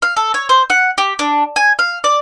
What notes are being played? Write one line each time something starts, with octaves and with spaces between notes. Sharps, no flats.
F5
A4
C#5
C5
F#5
G4
D4
G#5
F5
D5